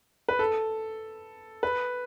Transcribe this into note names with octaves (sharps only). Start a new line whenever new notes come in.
B4
A4
B4